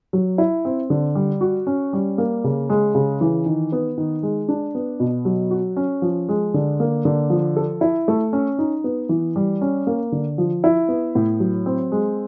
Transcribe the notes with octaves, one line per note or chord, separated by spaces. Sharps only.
F#3
E4
C4
D3
G3
F#4
C#4
G3
A#3
C#3
G#3
C#3
E3
D#3
B3
D#3
G#3
D4
B3
B2
F#3
F#4
C#4
F3
G#3
D3
A#3
D3
F3
A4
E4
A3
C#4
D#4
B3
E3
G3
C#4
A#3
D3
F3
E4
B3
A2
F#3
C4
G#3